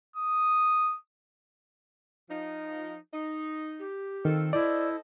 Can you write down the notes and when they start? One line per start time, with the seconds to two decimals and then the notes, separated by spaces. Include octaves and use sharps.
0.16 D#6
2.30 F3 D#4
3.13 D#4
3.79 G4
4.25 D#3 C4 F4 A4
4.53 E4 A4 C5 D5 D#5